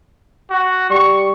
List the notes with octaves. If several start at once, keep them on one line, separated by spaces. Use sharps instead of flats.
F#4
G3 C#6